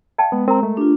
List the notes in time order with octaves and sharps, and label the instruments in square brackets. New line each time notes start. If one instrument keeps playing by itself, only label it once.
[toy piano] D#5 G5 A5 [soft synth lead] F5
[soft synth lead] G#3 [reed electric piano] B3
[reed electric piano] C4 [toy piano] A#4 A#5
[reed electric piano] A3
[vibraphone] D4 F4 [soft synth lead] G4